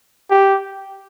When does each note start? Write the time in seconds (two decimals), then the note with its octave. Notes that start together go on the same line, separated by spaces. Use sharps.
0.30 G4